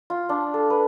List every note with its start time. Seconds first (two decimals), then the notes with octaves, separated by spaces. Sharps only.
0.10 F4
0.29 D4
0.54 A4
0.70 B4